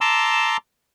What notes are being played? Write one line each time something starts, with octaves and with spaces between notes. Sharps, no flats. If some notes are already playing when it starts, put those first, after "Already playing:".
A5 A#5 C6 D6 E6